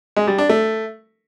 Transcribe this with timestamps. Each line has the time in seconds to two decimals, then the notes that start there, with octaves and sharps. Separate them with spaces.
0.17 G#3
0.27 G3
0.38 D4
0.49 A3